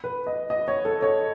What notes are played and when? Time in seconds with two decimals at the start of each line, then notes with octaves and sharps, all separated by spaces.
0.04 B4
0.27 D#5
0.50 D#5
0.68 C#5
0.85 A4
1.02 C#5